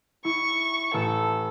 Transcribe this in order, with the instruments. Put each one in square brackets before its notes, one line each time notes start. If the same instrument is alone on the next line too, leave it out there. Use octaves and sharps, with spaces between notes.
[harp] E4 [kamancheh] C#6
[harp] A1 E6 [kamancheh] A4